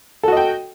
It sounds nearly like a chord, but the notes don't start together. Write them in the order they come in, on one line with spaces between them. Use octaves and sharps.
A4 F#4 D#5 G5